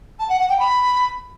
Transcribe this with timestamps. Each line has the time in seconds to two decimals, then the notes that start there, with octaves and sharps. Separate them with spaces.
0.19 A5
0.29 F#5
0.39 F#5
0.49 G5
0.59 B5